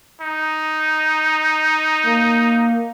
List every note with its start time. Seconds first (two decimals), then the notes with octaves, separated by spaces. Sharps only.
0.21 D#4
2.06 A#3